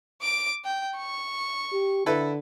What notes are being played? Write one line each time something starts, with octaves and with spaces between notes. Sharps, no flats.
D6 D7
G5
C#6
G4
D3 E4 A4 B4